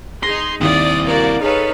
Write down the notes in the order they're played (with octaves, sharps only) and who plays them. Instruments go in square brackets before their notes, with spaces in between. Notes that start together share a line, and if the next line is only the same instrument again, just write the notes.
[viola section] D#4 G#4 [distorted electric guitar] C6 [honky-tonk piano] A#6
[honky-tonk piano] D#2 [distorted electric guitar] C4 E4 [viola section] D5 [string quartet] D#6
[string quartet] A#3 [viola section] F#4 D5
[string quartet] D#4 C#5 [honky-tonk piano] G#4 [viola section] A4 B4 F5